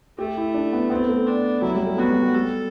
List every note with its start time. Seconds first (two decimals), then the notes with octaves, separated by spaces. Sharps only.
0.19 A3 G4
0.37 E4
0.54 D4
0.73 B3
0.90 B3 C4
1.08 A3
1.27 D4
1.62 F#3 E4
1.75 G3
1.86 A3
1.98 B3 F#4
2.10 G3
2.23 F#3
2.34 G3 A4